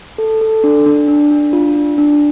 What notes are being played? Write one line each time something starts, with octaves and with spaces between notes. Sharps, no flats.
A4
A4
D4
D4
D4
D4
F4
D4
D4